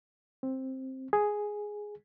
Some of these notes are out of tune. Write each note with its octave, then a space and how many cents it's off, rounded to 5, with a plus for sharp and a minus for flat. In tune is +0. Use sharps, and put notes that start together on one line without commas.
C4 +10
G#4 +0